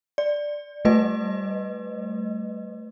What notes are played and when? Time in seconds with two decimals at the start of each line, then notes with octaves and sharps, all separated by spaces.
0.18 D5
0.85 G3 A3 B4 D#5